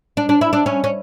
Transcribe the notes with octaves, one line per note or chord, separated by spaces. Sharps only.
D4
D4
E4
D4
C#4
C#4